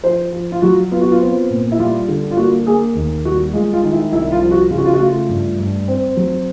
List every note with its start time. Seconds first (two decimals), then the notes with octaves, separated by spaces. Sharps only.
0.04 F3 C5
0.33 F3
0.52 F4
0.62 F#3 F#4
0.92 B3 F4
1.01 F#4
1.12 F4
1.21 C4
1.50 A#2
1.72 E4
1.79 G3 F4
2.08 D3
2.31 F4
2.37 A#3 F#4
2.66 A#3 G#4
2.95 D#2
3.24 G3 F#4
3.53 G#3 F4
3.73 F4
3.83 D#3
3.93 E4
4.12 C2 E4
4.32 F4
4.42 F3
4.51 F#4
4.70 C#3 F4
4.78 F#4
4.86 F4
4.93 F#4
5.00 A3 F4
5.29 G2
5.59 G2
5.88 C4
6.17 F#3